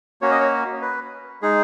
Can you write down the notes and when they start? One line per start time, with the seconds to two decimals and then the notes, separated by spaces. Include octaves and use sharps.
0.21 A#3 C#4 F#4 C#5
0.31 D#5
0.40 C#5
0.82 B4
1.42 G#3 D#4 G#4